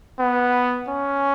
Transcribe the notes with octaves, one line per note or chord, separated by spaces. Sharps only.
B3
C#4